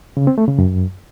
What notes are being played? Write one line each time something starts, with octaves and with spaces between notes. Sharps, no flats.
C#3
C4
A3
C#3
F#2